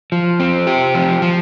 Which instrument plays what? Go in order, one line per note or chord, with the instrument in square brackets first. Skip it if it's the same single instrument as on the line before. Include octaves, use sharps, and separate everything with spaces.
[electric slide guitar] F3
C4
G4
F3
F3